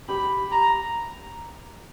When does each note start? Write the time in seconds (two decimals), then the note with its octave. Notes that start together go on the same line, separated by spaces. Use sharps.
0.09 G4 B5
0.51 A#5